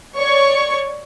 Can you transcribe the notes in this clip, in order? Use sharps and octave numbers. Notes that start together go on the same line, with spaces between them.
C#5 D5 C#6